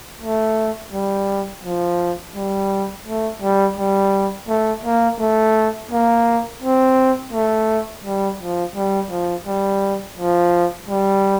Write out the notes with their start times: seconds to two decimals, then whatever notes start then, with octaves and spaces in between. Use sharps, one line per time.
0.21 A3
0.92 G3
1.63 F3
2.35 G3
3.06 A3
3.42 G3
3.77 G3
4.48 A3
4.84 A#3
5.19 A3
5.91 A#3
6.62 C4
7.32 A3
8.04 G3
8.39 F3
8.75 G3
9.10 F3
9.46 G3
10.17 F3
10.88 G3